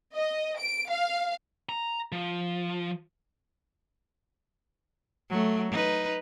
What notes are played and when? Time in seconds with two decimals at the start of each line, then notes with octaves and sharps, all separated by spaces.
0.15 D#5
0.58 D7
0.88 F5
1.69 A#5
2.12 F3
5.30 F#3 A3
5.71 D#4 B4